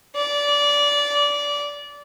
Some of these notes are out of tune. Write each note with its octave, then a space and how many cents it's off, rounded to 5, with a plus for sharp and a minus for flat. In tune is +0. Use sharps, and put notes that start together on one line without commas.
D5 -20